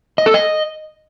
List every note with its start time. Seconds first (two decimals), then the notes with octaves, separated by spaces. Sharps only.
0.18 D#5
0.26 A4
0.34 D#5